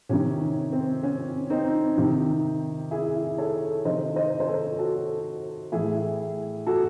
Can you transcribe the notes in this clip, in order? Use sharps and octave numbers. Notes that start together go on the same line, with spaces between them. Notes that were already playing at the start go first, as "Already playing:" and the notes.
C3 D#3 C#4
C4
C#4
C4 D#4
C3 D#3
E4 G#4
A4 C#5
C3 D#3 C5 D#5
C5 D#5
C5
A4 C#5
F#4 A4
A2 E3 E4 G#4
F#4 A4